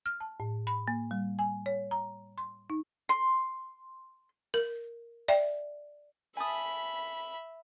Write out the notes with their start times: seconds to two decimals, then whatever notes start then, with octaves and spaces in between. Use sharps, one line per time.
0.06 F6
0.20 A5
0.40 A2
0.67 B5
0.88 A#3
1.11 G3
1.39 G#5
1.66 C#5
1.91 A#5
2.38 C6
2.70 D#4
3.09 C6
4.54 A#4
5.28 D5 E5 G5
6.37 E5 G#5 A5 B5 D#6